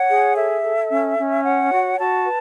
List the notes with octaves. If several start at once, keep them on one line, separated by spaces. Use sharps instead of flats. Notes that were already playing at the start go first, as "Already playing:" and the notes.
Already playing: C#5 F#5
G#4
A4 E5
A4
C#4
C#4
C#5 F#5
F#4
F#4 A5
B4